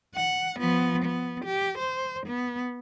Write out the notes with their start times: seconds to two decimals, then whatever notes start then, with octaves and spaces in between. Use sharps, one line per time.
0.15 F#5
0.59 F3 B3
1.05 B3
1.45 G4
1.79 C5
2.27 B3